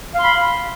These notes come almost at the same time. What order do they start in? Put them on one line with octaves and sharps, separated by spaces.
F5 C6 B5